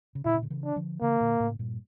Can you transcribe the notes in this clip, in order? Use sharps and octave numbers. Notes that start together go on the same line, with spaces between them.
C#3
A#2 D3 E4
C#3
D3
C#3 E3
D4
D3 F3
C#3 E3 A#3
A#2 D3
A2 C#3
G2 A#2